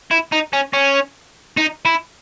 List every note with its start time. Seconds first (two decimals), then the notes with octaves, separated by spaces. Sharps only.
0.11 E4
0.32 D#4
0.53 C#4
0.73 C#4
1.57 D#4
1.85 E4